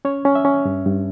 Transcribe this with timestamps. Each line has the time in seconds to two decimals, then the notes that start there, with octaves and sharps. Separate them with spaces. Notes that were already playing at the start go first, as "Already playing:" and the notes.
0.05 C#4 C#5
0.25 C#4
0.35 E5
0.45 C#4
0.65 G2
0.85 G2